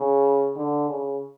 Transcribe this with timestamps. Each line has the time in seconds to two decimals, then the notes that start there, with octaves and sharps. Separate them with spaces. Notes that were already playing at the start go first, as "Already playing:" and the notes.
Already playing: C#3
0.56 D3
0.88 C#3